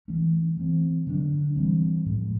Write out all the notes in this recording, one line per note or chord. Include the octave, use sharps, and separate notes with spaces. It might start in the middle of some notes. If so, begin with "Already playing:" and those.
E3 A3 C#4
E3 A3 C4
D3 F#3 B3 D4
E3 G3 C4
A2 F3 G#3